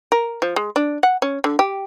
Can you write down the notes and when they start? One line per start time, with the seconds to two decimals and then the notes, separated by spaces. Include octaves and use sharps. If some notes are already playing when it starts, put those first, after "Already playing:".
0.12 A#4
0.42 F3
0.56 G#3
0.76 D4
1.03 F#5
1.22 C#4
1.44 D3
1.59 G4